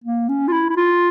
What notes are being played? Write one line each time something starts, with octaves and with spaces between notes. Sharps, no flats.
A#3
C#4
F4
E4
E4
F4